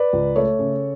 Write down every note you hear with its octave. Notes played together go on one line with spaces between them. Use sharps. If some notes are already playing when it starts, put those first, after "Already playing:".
Already playing: B4 D5
C#2
A3 A4 C#5
C#3